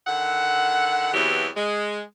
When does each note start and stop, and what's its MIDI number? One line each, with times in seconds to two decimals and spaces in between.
0.07 1.12 50
0.07 1.12 51
0.07 1.12 76
0.07 1.12 78
1.14 1.48 40
1.14 1.48 47
1.14 1.48 52
1.14 1.48 54
1.14 1.48 60
1.14 1.48 67
1.56 2.01 56